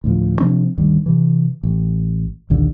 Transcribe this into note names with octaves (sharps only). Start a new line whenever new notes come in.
D2 A2 F3
C3 F3 C4 D4
D2 G2 D#3
C3 E3
A1
A#1 D#2 D3